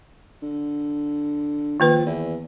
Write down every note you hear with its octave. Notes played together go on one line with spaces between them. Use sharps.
D3
D#3 F3 A#3 B4
E2